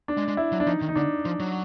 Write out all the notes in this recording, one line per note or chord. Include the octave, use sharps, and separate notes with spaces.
D4
G#3
G#3
E4
F#3
D4
F3 D#4
D#3
D#4
D3 D4
F3
F#3